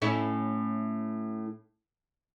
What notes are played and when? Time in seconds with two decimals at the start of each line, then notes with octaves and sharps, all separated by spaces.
0.02 A2 C#4 E4